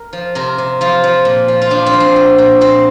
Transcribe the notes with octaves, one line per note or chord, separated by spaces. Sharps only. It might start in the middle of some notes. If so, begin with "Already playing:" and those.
Already playing: A#4
F3
C3 A#4
C3
F3 F4
F3
A#2
F3
F4
F3 D4
C4
F3
D4
A#2
A#2
A#2 C4